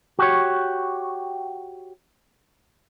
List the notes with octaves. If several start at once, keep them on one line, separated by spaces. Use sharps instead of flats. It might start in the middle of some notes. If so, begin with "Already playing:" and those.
F#4 G4 C#5